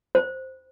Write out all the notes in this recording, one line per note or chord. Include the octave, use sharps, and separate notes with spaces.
C5